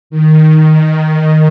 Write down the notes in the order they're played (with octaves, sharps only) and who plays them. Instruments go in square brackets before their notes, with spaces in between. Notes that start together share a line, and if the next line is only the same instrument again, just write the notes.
[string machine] D#3